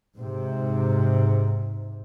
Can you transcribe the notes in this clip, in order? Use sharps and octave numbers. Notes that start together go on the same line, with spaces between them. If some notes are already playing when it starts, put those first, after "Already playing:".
G#2 C3